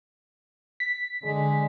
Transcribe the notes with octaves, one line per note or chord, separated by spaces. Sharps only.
B6
D3 G#3